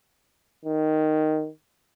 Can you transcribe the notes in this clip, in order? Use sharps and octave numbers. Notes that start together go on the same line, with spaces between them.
D#3